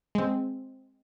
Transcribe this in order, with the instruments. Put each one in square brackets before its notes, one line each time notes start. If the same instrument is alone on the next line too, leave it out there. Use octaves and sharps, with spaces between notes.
[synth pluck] G#3 C4